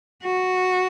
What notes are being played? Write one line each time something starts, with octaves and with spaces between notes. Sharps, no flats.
F#4